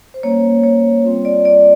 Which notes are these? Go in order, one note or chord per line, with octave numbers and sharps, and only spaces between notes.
C5
G3 A#3 C#4 C#5
C#5
G3 C4 F4
D5
D5